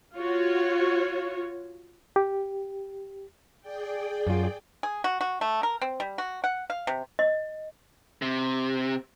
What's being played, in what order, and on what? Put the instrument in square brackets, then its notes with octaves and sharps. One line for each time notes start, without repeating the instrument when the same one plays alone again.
[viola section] F4 F#4 C#5
[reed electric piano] G4
[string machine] G#4 D5 G5
[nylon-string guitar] F#2 F4
[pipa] G#4
F#4
F#4
A3
A#4
C4
G3
F#4
F#5
F5
C3
[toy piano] D#5
[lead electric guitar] C3